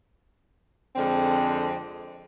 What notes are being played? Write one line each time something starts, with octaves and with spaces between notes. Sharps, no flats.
F2 D3 G#3 C4